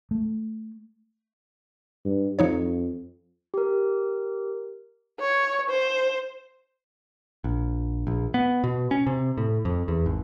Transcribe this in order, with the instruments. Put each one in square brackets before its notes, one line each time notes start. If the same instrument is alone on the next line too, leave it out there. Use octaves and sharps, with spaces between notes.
[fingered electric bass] A3
[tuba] G2
[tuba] F2 [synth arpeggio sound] F3 D#4 C#5
[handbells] G4 A#4
[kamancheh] C#5
C5
[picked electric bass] A#1
A#1
B3
B2
C#4
C3
A2
F2
E2
G#1